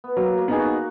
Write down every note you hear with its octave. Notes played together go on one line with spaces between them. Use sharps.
B3
F#3 A#3
A#3
B3 D#4 G#4
F#4